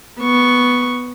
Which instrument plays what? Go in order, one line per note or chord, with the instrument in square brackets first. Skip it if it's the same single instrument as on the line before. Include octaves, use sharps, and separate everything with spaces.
[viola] B3 C#6